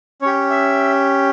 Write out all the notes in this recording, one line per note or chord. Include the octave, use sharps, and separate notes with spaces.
C#4 G4 C#5
E5